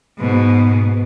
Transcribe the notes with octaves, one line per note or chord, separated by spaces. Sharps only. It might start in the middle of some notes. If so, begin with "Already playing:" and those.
G#2 B2